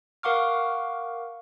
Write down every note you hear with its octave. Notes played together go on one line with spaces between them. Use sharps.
A#4 F5 F#5 C#6 D6 F6